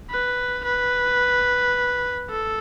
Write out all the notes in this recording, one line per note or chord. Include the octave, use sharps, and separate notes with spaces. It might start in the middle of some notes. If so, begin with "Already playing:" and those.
B4
B4
A4